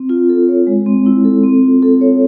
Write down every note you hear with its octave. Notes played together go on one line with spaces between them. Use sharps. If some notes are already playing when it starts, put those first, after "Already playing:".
Already playing: C4
F4
A4
C#5
G#3
C4
E4
A4
C4
F4
A4
C#5